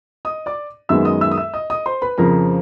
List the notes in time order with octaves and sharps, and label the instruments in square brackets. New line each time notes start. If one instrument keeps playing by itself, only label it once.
[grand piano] D#5 D#6
D5 D6
[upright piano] F#2 D#3 G#3 B3 [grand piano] E5 E6
[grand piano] D#5 D#6
E5 E6
D#6
E5 E6
D#5 D#6
D#5 D#6
C5 C6
B4 B5
[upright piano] F2 C#3 F3 [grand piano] A#4 A#5